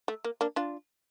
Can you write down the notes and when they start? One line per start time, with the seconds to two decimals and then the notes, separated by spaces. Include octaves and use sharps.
0.08 A3
0.25 A#3
0.41 A#3 D4
0.56 D4 F4